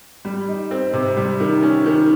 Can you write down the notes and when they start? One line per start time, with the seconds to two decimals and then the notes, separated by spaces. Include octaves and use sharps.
0.25 G3
0.48 D#4
0.71 C4
0.93 C3
1.17 G3
1.40 D#3
1.63 C#4
1.86 D#3